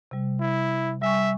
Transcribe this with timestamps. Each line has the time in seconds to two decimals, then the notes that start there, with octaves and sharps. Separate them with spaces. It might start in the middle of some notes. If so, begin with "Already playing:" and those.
0.11 C3 G3
0.40 E4
1.02 G3 E5 G#5 C#6